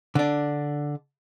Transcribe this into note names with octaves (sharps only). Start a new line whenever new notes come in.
D3 D4